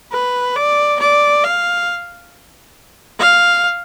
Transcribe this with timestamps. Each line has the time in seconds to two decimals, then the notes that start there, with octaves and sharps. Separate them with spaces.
0.12 B4
0.56 D5
1.00 D5
1.44 F5
3.19 F5